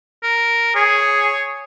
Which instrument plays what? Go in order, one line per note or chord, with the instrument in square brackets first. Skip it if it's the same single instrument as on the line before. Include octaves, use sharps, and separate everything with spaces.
[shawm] A#4
[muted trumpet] G#4 [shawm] C#5